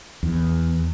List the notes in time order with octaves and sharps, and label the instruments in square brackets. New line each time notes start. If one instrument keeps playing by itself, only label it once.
[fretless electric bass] E2